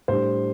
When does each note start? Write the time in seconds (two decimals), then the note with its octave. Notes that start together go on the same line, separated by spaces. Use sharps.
0.08 A2 G3 D4 C5